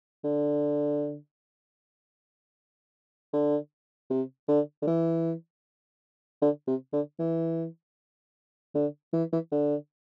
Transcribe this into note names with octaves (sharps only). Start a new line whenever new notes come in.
D3
D3
C3
D3
D3
E3
D3
C3
D3
E3
D3
E3
E3
D3